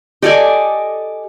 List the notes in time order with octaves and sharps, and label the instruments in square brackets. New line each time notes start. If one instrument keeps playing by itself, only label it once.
[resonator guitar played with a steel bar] G4 A4 D5 [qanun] D#5 G#5